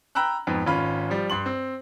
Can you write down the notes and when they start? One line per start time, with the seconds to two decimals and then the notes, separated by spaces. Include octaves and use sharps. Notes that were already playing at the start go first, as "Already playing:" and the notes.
0.15 G5 A#5 B5 E6 F#6
0.47 F2 G#2 B3
0.66 G#1 C#4 F4 B5
1.10 F3 G3
1.30 G2 C6 F#7
1.46 C4